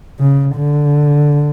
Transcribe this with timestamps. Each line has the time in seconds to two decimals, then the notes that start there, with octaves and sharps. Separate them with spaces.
0.19 C#3
0.56 D3